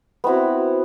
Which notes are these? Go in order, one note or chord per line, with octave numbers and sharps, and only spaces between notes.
B3 C4 E4 F#4